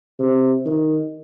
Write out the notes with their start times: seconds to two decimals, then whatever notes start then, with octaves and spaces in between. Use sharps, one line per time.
0.20 C3
0.66 D#3